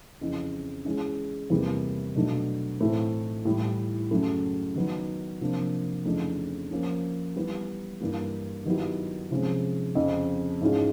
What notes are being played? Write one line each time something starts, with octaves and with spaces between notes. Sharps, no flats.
F2 C#3 E3
E3 G#3 C#4
E2 C3 E3 G3 A#3
B2 F#3 A3 D4
A2 E3 A3 C4 E4
A2 E3 G3
F#2 C#3 F#3 A3
D#3 F#3 B3
C3 F3 A#3 D4
F2 C#3 E3 A3 D4
F3 A#3 C#4
E3 G3 B3
G2 E3 G3 A#3
D#3 F#3 B3 E4 G4
C3 F3 G#3 C#4
F2 C#3 F3
G#2 E3 G#3 C#4 F4